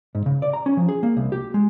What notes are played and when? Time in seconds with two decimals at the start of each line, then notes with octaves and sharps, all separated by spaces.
0.15 G#2
0.26 C#3
0.42 D5
0.53 A#5
0.66 C#4
0.77 F3
0.89 G#4
1.03 A#3
1.17 C2
1.32 G4
1.54 G#3